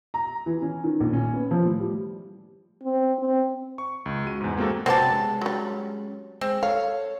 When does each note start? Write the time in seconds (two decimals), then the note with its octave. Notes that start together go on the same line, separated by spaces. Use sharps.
0.14 A#5
0.46 E3
0.62 C#4
0.84 D#3
1.00 A#1
1.13 C#4
1.34 B3
1.51 F3
1.65 A2
1.80 G3
2.83 C4
3.19 C4
3.78 C#6
4.06 C#2
4.25 G#3 F#4 D#7
4.41 E2 G#2
4.57 G#3 A#3 C4 F#4 A4
4.86 C3 F#3 B3 C4 G4 D5 A5
5.10 G#3 C#4
5.41 F#3 G3
6.41 G#3 C4
6.63 A4 C#5 F5